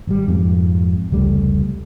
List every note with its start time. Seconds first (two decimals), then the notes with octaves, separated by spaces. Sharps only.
0.07 G#1 G3
0.27 F2 G#2
1.11 F1 C#2 G3 A3